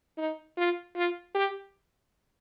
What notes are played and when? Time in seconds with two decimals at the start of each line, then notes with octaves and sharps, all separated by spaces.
0.18 D#4
0.58 F4
0.96 F4
1.35 G4